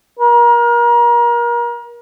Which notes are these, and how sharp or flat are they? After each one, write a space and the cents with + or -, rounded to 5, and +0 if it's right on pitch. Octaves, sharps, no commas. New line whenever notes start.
A#4 +30